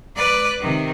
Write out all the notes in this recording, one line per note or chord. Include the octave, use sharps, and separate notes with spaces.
B4 D5
C3 D#3